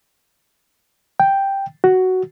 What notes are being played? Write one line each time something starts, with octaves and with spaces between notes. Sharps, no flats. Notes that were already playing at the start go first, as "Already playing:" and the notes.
G5
F#4